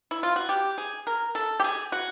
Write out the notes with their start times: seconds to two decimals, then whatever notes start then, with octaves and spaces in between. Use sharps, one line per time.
0.11 E4
0.23 F4
0.36 F#4
0.49 G4
0.78 G#4
1.07 A#4
1.35 A4
1.60 G4
1.64 G#4
1.92 F#4